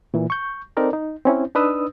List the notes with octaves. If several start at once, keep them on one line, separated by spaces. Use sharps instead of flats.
A#2 E3
C#6 G6
C4 D#4 A4 A#4 D5
D#4
C4 C#4 E4
D4 D#4 B4 D#6 E6